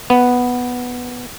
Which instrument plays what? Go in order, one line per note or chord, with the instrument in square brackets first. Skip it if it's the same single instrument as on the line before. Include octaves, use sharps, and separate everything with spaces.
[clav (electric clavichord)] B3